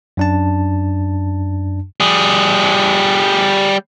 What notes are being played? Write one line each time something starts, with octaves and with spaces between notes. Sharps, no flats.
F#2 D4 A5
G3 G#4